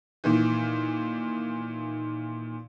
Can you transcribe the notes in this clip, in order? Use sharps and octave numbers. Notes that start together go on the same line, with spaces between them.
A#2 D#3 E3